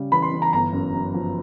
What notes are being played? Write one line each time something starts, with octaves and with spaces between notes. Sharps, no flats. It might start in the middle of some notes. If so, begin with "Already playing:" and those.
Already playing: C#3 G3
E3 B5
C6
E3
A#5
G1 A#5
F#2
F#2
F3